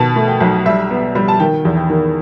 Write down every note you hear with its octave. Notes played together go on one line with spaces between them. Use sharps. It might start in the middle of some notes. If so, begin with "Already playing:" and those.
Already playing: B2 D#3 A5
A3
G5
B1
G3 E5
B3
G3
A5
D#3 G5
E2
G5
D#3